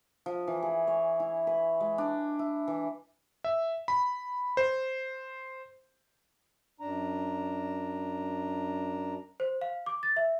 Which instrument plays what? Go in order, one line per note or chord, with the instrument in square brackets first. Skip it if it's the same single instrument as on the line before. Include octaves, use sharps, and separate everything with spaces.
[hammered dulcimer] F3
E3
G#4
C#5
E4
B4
G#3
D4
E4
E3
[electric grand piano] E5
B5
C5
[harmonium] F#2 D4 A#5
[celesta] C5
F5
D6
A6
E5